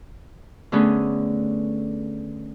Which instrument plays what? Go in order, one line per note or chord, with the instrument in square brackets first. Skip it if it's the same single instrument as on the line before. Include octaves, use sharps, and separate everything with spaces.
[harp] D3 A3 B3 C#4 G#4